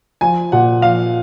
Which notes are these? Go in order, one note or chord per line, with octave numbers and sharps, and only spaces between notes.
F3 G#5
A#2 F#5
F3 F5